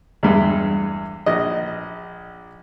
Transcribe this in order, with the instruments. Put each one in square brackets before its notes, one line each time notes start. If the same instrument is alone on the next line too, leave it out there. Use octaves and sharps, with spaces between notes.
[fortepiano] E2 G2 G#3
A#1 D#5